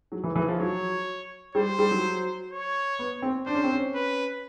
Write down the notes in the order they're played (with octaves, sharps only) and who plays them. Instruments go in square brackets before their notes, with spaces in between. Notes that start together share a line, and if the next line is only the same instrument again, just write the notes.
[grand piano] F#3
E3
E3
F3
[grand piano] F#3 [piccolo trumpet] C#5
[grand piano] G3 [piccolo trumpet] C5
[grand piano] G3
F#3
[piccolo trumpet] C#5
[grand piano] B3
C4
[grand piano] D4 [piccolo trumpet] C5
[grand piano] C#4
C4
C#4
[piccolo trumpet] B4